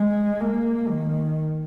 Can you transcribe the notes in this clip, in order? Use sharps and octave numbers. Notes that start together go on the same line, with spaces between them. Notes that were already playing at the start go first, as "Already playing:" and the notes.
Already playing: G#3
A#3
D#3